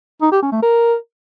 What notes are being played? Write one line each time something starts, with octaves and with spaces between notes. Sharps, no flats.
D#4
G4
C#4
A3
A#4